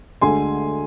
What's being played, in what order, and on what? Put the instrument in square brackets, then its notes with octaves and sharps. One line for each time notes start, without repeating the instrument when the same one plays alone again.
[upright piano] D2 D3 G#3 G#5 C6